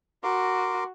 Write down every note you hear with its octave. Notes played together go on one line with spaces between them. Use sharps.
F#4 A#4 C6 D6